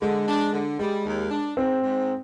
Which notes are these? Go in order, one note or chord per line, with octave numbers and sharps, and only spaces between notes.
D3 G#3
D4
D3
G3 G#3
D#2
D4
G#2 C4
G#2